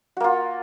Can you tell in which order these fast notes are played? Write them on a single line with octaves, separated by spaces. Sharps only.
F#4 A#3 F4